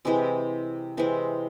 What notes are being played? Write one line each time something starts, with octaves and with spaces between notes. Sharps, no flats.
C3 E3 G#3 C4
C3 E3 G#3 C4